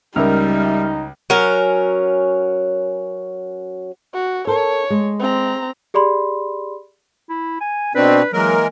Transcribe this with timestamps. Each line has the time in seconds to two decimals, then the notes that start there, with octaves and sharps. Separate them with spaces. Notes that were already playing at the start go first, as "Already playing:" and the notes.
0.16 C#2 G3 D#4 A#4 E5 F6
1.30 F#3 C#4 A#4
4.14 F#4
4.47 A4 A#4 C#5
4.90 G#3
5.19 C4 A#5
5.94 G4 G#4 D5 B5 C6
7.29 E4
7.61 G#5
7.95 B2 C4 D4 B4
8.33 E3 F#3 G#3 A#3 A#4